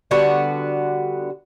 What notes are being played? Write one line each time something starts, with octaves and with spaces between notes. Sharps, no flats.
D3 G3 B3 F#4